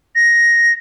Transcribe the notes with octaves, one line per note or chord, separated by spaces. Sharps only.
A#6